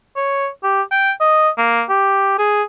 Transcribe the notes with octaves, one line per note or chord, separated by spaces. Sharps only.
C#5
G4
G5
D#5
A#3
G4
G#4